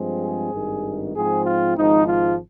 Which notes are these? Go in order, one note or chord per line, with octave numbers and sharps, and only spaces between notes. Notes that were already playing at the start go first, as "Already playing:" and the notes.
Already playing: G2 F3 G#3 C4
G#4
G#1 G2 D#3
G#2 F3 C4 G#4
F4
G#1 G#2 F3 D#4
F4